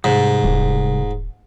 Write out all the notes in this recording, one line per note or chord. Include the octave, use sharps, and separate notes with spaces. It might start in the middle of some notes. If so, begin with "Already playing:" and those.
C2 G#2
D#1